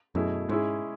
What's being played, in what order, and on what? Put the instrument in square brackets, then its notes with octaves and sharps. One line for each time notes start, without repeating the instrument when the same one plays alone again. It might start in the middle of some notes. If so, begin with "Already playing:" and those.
[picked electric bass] F#2 [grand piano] B2 A3 E4 G#4
[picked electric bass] G#2 [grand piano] G#3 C#4 E4 G#4